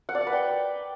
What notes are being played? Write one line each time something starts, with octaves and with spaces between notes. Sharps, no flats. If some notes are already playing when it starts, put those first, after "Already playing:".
F#5
D5
F#5
B4
G5